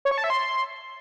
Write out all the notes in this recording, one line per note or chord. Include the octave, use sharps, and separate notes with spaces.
C#5
C#6
A5
E5
C6